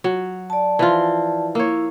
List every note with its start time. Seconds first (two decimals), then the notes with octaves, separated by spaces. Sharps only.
0.04 F#3
0.50 D5 A5
0.79 E3 F3 F4
1.55 A#3 E4 C#5